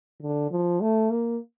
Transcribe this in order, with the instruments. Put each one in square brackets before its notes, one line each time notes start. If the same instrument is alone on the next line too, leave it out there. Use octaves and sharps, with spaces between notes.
[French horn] D3
F3
A3
A#3